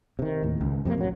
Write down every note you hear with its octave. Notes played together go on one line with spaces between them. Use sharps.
C3 D#3
D#2 A2
C#2
F2 C3 G3 A#3
A1 F#3